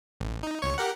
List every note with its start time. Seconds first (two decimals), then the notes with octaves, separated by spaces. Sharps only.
0.20 A1
0.43 D#4
0.62 C#2 C#5 C#6
0.78 G4 A#4 F#5